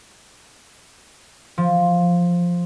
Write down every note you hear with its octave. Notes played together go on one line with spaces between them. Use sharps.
F3